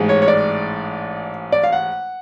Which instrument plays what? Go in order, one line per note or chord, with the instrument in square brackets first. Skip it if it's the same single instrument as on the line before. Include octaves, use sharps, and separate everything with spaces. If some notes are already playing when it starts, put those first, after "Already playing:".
Already playing: [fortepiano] A1 G#2 G#3
C#5
C#5
D5
D5
F5
F#5